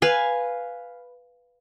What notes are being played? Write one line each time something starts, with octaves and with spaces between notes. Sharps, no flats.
B4 F5 G#5